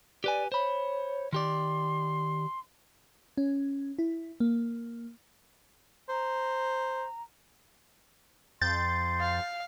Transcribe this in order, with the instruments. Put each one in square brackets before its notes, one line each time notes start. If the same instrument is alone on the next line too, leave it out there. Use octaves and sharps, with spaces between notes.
[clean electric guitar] G4 B4 G#5 [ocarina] D5
[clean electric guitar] C5 B5 [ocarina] C#5
[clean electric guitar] D#3 G4 D5 [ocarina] C6
[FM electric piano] C#4
E4
A#3
[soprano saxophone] C5 [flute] A#5
[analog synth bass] F2 [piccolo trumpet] C6 [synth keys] G6 A6
[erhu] F5